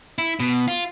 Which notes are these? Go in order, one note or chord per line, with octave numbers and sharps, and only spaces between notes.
E4
B2
F4